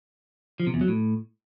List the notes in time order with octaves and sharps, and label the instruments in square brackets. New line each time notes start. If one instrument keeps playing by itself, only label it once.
[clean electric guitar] F3
C3
E2
F#3
A2